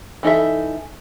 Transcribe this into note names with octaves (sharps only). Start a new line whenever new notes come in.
E3 D#4 A4 E5